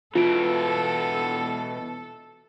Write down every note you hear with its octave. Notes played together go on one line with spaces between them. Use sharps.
B2 E3 F4 A4 D7